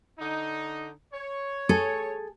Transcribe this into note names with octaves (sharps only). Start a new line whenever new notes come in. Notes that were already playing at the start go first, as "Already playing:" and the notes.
D3 D#4
C#5
G#4 A4